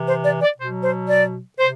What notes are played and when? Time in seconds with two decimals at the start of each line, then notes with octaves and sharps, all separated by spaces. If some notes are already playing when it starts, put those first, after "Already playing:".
Already playing: C3 E3
0.09 C5
0.25 D5
0.42 D5
0.59 B2 C5
0.62 F#3
0.84 C5
1.08 D5
1.58 C3 C5